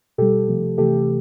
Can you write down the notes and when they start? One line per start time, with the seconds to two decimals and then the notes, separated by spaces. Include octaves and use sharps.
0.18 B2 G3 G4 A4
0.48 C3 F3 A3
0.78 C3 E3 A3 G4 A4